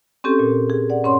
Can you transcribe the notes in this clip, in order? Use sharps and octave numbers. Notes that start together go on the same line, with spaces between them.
C4 C#4 G4 A4
A#2
G#4
D5 F#5
G2 C#4 C#5 F#5 C6